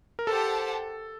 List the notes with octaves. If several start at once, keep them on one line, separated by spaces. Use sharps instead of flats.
A#4
G4 A4 C5 F#5 A5